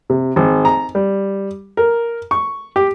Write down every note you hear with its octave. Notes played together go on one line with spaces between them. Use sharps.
C3
G#1
A#5
G3
A#4
C#6
G4